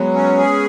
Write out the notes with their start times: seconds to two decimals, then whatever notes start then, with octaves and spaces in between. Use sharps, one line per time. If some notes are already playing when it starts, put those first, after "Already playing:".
Already playing: F#3 G#3 B3
0.14 C#4
0.38 G#4